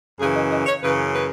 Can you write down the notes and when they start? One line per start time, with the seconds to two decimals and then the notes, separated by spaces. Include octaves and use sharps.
0.19 F#2 C#3 E3 G#4
0.35 D#5
0.51 D#5
0.66 C#5
0.81 F#2 C#3 E3 B4
1.13 B4